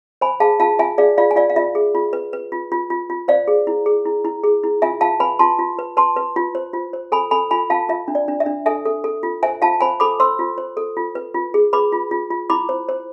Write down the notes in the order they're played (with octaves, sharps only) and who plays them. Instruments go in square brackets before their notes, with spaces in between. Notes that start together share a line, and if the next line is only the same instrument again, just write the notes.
[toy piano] C5 G#5 B5
G#4 F5 A5
F4 F5 A5
F4 E5 G#5
G#4 D5 F5
F4 D5 F5
G#5
F4 D5 F5
F5
F4 E5
G#4
F4
B4
B4
F4
F4
F4
F4
C5 D5 F5
G#4
E4
G#4
E4
E4
G#4
E4
F4 E5 G#5
F4 F5 A5
B4 G#5 B5
F4 A5 C6
F4
B4
B4 A5 C6
B4
F4
C5
F4
C5
A4 G#5 B5
A4 G#5 B5
F4 G#5 B5
F4 F5 A5
F4 E5
D4
D5
D4
E5
D4
A4 E5 G#5
A4
A4
F4
C5 E5 G#5
F4 F5 A5
C5 G#5 B5
A4 B5 D6
C5 C6 E6
F4
C5
A4
F4
B4
F4
G#4
B4 B5 D6
F4
F4
F4
E4 B5 D6
C5
C5